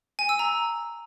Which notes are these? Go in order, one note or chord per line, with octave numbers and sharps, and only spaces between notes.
G#5
E6
A#5